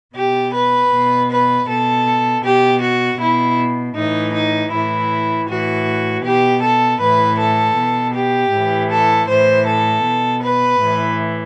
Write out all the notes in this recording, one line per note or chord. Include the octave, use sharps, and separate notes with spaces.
B2 G4
B4
B2
B4
B2 A4
B2 G4
F#4
B2 E4
A2 E3 D#4
D#4
A2 E3 E4
A2 E3 F#4
B2 G4
A4
A2 E3 B4
A4
B2
G4
A2 E3
A4
A2 E3 C5
A4
B2
B4
A2 E3